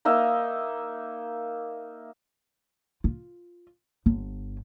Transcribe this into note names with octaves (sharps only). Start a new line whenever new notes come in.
A#3 D#4 D#5 E5
F4
G1